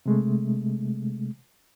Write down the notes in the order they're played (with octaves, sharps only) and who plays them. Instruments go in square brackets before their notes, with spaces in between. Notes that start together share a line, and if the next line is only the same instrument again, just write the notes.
[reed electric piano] C3 G#3 A3